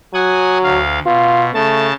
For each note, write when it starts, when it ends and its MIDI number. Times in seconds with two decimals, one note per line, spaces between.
0.14 0.79 54
0.14 0.58 78
0.14 0.58 80
0.14 0.58 87
0.64 0.99 38
0.64 0.99 77
1.06 1.51 47
1.06 1.48 65
1.54 1.93 49
1.54 1.88 57
1.54 1.93 81